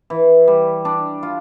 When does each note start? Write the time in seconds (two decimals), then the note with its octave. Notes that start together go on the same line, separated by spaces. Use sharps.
0.10 E3
0.48 G3
0.85 D4
1.23 F4